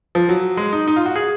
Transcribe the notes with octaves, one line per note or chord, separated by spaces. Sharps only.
F3
F#3
G#3
D#4
D#4
F4
F#4
G#4